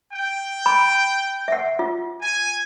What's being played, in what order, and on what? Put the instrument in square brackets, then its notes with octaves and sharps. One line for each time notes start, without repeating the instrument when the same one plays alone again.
[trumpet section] G5
[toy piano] B5
E5 F#5
F4
[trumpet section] G#5